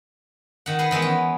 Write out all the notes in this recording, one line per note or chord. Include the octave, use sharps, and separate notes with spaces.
D#3 F#5
G#4 B4
D#3 E3 G#3 B3
C#4